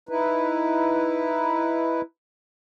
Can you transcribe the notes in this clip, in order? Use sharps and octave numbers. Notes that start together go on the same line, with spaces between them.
D#4 E4 B4